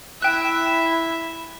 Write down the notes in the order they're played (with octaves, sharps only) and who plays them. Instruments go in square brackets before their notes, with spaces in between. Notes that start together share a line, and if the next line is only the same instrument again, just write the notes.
[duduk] E4 [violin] E5 [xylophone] G5 F#6